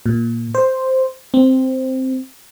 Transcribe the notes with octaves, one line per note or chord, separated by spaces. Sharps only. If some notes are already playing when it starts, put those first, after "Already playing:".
A#2
C5
C4